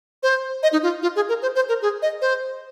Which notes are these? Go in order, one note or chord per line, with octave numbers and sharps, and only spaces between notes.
C5
D#5
D#4
F4
F4
G#4
A#4
C5
C5
A#4
G#4
D#5
C5